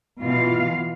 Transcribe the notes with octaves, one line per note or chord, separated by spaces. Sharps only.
B2 E3 F4 F5